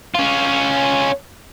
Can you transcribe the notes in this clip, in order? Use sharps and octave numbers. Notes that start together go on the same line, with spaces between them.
C#4 F4